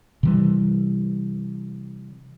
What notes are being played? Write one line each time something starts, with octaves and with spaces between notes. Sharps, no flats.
C3 E3 G3